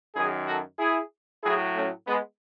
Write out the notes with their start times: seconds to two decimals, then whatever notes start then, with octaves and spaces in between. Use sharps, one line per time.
0.14 F#2 D#3 F#3 E4 G#4
0.47 F#4 A4
0.79 E4 G#4
1.43 A2 F#3 E4 G#4
1.75 A3 C#4
2.07 G#3 B3